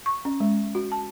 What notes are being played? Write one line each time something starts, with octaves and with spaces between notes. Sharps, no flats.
C#6
C#4
G#3
F#4
A5